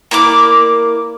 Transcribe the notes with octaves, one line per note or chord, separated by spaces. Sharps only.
A#3 E4 D5 D6